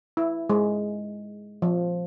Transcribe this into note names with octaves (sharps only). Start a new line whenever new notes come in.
E4
G#3
F3